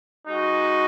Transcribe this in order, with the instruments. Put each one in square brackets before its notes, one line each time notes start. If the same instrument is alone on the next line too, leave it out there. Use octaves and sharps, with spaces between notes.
[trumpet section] G#3 D#4 F#4